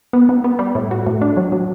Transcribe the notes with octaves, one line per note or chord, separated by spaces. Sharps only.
B3
B3
B3
G3
A2
F#4
A2
D4
F#3
F#3